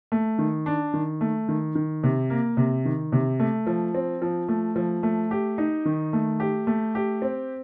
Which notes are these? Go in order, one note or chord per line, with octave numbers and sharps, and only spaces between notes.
A3
D#3
D4
D#3
A3
D#3
D#3
C3
A#3
C3
D#3
C3
A3
F3
C4
F3
A3
F3
A3
G4
D#4
D#3
A3
G4
A3
G4
C4